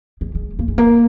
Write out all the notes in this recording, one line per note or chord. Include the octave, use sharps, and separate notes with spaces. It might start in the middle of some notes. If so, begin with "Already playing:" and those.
G#3
G#3
A#3
G#3
A#3